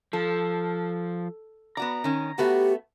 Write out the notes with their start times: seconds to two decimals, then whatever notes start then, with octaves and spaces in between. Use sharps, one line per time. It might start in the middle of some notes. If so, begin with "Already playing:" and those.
0.13 F3 A4
1.77 B3 F#4 D5 A#5
2.04 D#3 C#4
2.38 A3 B3 F#4 G4